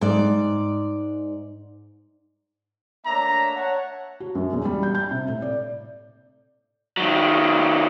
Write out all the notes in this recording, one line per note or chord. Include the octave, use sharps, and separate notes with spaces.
G#2 D5
A3 A#3 D4 C#5 E5 A#5
C#5 F#5 A5
F#4
F#2
E2
G3
G6
G6
C3
A2
D5
D#3 F#3